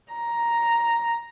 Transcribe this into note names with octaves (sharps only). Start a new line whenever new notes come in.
A#5